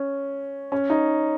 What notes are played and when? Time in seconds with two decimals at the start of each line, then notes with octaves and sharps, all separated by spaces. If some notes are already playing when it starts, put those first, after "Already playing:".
Already playing: C#4
0.72 C#4
0.90 D#4